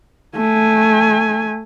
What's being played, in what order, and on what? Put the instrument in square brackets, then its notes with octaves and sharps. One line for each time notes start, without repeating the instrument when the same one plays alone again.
[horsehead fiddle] A3 G#5